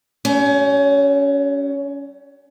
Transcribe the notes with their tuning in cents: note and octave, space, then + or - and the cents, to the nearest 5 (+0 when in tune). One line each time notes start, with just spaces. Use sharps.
G3 -30 C#4 +20